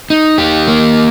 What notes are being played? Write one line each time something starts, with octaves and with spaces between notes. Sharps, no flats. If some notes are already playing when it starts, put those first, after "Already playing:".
D#4
G4
A#3